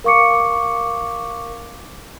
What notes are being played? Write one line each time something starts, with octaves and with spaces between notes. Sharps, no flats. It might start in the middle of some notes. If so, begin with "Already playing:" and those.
A#4 F5 C#6 D6 C#7